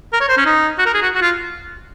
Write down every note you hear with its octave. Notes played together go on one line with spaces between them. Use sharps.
A#4
C#5
C5
C#4
D#4
F#4
A#4
G#4
F#4
F#4
F4